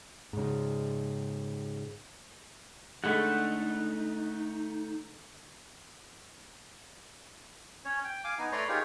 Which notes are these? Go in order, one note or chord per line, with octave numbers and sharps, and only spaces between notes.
G#2 C#3
D3 G#3 A3 C#4 D#4 F#5 B5
C#4 C#5
G5
F5 G#5 D6
B3 D#4 G#5
A3 B4 C#5 D5 A#5 C6
D#4 F4 G4 G#4 A#4 C#5